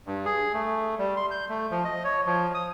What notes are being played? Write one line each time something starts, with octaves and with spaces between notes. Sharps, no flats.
G2
G#4
A3
G3
C6
G6
A3
F3
D#5
C#5
F3
D#6